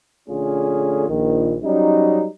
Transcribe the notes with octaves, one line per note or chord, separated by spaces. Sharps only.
A#1 D3 A3 C#4 F4 G#4
A#1 D#3
F#3 G3 C#4 D#4